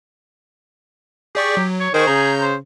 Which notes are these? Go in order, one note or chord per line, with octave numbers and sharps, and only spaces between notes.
G4 G#4 D5 C#6
F#3
C#5
D#3 G#4 C5 C#6
C#3 A#5 G6
C5